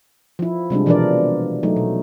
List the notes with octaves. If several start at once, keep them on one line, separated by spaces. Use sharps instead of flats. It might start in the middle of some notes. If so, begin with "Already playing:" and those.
F3 E4
C3 G3 G#3 D4
B2 E3 F3 D4 A#4 D5
F#3 A3 D#4
B2